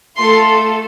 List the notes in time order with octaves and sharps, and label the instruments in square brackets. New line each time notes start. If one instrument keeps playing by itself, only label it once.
[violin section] A3 F4 A4 C6